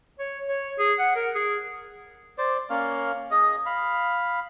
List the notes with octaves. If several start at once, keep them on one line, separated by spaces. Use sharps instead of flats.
C#5
C#5
G#4
F#5
A#4
G#4
C5 D5
A#3 C#4 F5
G#4 D#5
F5 B5